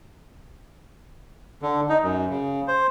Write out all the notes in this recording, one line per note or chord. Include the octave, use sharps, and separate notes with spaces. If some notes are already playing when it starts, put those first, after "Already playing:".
D3
D#4
F#2
C#3
C5